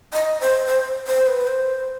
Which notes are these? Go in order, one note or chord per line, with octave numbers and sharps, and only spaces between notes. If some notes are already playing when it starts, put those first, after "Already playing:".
D#5
C5
C5
C5
B4
C5